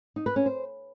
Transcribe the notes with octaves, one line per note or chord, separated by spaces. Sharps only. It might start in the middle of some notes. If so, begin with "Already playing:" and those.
D#4
B4
C#4
C5